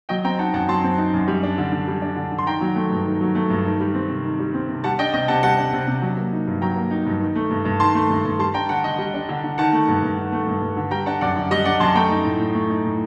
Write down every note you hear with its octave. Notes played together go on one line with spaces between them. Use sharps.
F#3 D#5 G5
C4 G5 A#5
D#4 F#5 A5
F#2 F#5 A5
F#3 A5 C6
C4
D#4
F#2
G3
D4
D3
D3
G3
D4
D3
D3
C6
D#3 G5 A#5
F#3
A3
G2
D#3
F#3
A3
G2
D#3
G3
C4
C3
D#3
G3
C4
C3
G3 F#5 A5
D4 D#5 G5
C3 D#5 G5
C3 F#5 A5
G3 F#5 A5
D4
C3
C3
F#3
A#3
D#4
G2
F#3 G5 A#5
A#3
D#4
G2
D#3
A3
G2
G2
D#3 A5 C6
A3
G2
G2
G3 A5 C6
D4 G5 A#5
D3 F#5 A5
D3 D#5 G5
G3
D4
D3
D3
D#3 F#5 A5
A3
G2
G2
D#3
A3
G2
G2
D3
G3 G5 A#5
D4 F#5 A5
F#2 D5 F#5
D3
G3 D#5
D4 D5 F#5
F#2 A5 C6
A3 G5 A#5
D#4
A2
A2
A3
D#4
A2